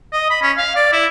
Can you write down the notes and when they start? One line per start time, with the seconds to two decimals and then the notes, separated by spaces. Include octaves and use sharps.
0.13 D#5
0.30 B5
0.42 C#4
0.57 F5
0.76 D5
0.93 E4